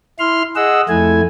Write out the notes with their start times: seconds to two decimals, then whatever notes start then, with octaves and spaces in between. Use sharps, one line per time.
0.19 E4 C6 F6
0.56 G#4 D#5 F#5 E6
0.89 F2 A3 E4 G#5